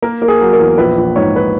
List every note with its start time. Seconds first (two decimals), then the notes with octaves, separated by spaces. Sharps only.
0.02 A#3 A#4
0.22 A#3
0.28 G#4
0.41 F#3
0.53 A#4
0.60 E2
0.78 A#1 B4
0.97 A#1
1.16 G#2 C#5
1.36 B4